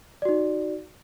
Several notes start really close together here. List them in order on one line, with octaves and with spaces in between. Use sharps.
D5 F#4 D#4